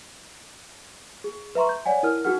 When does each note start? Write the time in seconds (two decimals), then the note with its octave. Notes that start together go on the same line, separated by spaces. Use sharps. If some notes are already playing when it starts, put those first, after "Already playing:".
1.24 G#4
1.55 B4 E5 A#5 C6 C#6
1.69 G6
1.86 C#5 D5 F#5 G#5
2.03 E4 A#4 F6
2.24 D#4 F#4 G#4 F#5 F6